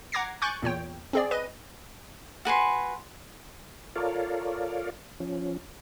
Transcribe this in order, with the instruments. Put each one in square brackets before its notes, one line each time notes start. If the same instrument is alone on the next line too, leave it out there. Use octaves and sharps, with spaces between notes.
[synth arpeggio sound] F#5 A#5 D6 G#6 A#6 C7
G#5 C#6 D6 F#6 G6 A6
E2 A#2 C#5 G5
C4 G#4 D5
B4 D#5 D#7
[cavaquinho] F#4 B4 G#5 C6
[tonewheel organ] F4 A4 A#4 C#5 D5 F5
F3 C#4